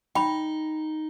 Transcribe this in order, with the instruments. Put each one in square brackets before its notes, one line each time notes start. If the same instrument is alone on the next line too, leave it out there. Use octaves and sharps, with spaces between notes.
[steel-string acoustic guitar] D#4 [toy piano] G5 B5